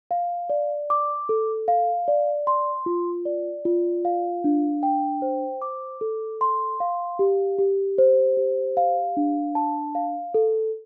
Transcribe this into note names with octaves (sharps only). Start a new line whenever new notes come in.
F5
D5
D6
A4
F5
D5
C6
F4
D5
F4
F5
D4
G5
C5
D6
A4
C6
F5
G4
G4
C5
G4
F5
D4
A5
F5
A4